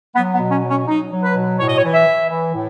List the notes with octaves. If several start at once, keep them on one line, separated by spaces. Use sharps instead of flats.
F#3 B3
B3
B2
C#4
F#3
C#4
F#3 D#4
F#3
B4
B2
A2 C#5
D#5
C#5
E3
E5
E3
E3
A2